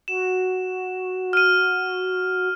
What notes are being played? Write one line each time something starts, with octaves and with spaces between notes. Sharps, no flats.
F#4 E7
F6 D#7